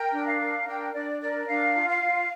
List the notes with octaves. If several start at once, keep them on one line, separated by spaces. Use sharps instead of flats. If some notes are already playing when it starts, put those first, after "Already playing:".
Already playing: A#4 G5
D4
F5
A#4
D4 G5
D4 D5
A#4 D5
D4 F5
F4
F5
F4